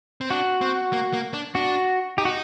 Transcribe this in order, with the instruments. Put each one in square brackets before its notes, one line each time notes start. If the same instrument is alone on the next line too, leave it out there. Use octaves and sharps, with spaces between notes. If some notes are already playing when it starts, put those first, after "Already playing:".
[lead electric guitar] C4
[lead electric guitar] D4 [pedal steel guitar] F#4
[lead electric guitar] C4
A#3
A#3
D4
[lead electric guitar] D4 [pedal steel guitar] F#4
[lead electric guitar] D#4 [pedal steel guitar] G4
[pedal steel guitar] F#4